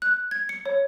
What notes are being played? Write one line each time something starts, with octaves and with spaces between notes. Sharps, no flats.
F#6
G#6
C#7
C#5